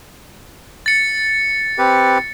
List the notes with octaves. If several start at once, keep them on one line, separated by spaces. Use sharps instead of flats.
A6 C#7
C4 G4 B4